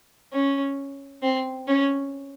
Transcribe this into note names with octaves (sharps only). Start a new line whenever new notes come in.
C#4
C4
C#4